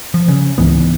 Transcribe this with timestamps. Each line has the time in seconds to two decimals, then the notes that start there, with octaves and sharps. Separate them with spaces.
0.14 F3
0.28 C#3
0.58 C#2 G#2 E3 B3